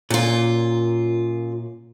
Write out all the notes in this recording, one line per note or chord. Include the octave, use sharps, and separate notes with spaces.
F#2 A#2 F4